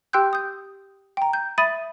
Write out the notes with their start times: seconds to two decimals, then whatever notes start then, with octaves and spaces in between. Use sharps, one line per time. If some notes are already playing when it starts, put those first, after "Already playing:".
0.13 G4 G5 C6 E6 F#6 G6
0.33 D#6 G6
1.17 G5 A#5
1.33 G6
1.58 E5 B5 D#6 A6 D#7